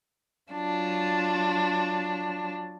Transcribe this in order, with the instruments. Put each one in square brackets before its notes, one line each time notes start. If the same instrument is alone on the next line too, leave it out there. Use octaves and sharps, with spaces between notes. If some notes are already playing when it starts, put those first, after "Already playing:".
[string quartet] F#3 D4 F4